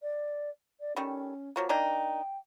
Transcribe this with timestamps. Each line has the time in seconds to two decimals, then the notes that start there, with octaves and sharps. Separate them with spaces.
0.02 D5
0.80 D5
0.96 D#3 G3 A3 C#4
1.56 F3 F#3 A#3
1.69 A#3 D4 D#4 G5